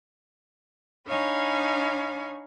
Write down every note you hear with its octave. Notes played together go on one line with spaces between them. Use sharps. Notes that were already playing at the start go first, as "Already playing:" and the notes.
D4 D#4 C#5 F5 G#5 B5